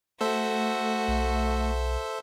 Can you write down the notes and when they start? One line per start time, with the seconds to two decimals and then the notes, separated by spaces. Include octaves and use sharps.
0.21 A3 F#4 A4 C5 E5
1.08 B1